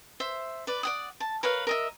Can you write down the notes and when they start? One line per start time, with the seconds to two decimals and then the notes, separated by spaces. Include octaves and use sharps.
0.20 C5 E5
0.67 B4 D5
0.83 D5 F#5 D#6
1.20 A5
1.43 A#4 B4 C#5 F5
1.67 A#4 D#5 E5